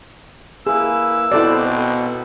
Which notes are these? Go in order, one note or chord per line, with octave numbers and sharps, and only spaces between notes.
A#3 E4 G#4 B4 E6
B2 C4 E4 A4 C5 D5 F#6